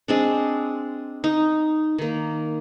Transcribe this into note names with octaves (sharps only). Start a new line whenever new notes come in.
G#3 C4 D4
D#4
D#3 A#3